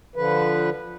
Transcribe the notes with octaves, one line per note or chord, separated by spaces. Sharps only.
D3 F3 B4